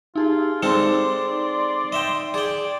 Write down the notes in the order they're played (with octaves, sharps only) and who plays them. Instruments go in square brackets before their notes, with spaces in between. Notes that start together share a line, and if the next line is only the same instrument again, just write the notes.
[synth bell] D#4 G4 G#4 [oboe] F4
[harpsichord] G#3 C4 A4 [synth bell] D#4 [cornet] D5 [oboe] C6
[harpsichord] D#5 E5 G5
[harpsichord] G#4 G5 [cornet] D5